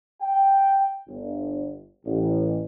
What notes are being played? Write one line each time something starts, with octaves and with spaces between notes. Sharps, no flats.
G5
G1
A1